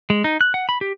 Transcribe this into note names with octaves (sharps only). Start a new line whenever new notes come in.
G#3
D#4
F#6
F#5
B5
G4